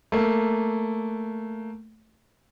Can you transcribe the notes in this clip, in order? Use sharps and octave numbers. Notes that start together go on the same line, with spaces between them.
A3 A#3